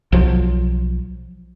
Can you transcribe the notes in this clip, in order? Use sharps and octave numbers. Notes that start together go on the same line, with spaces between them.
B1 F3 F#3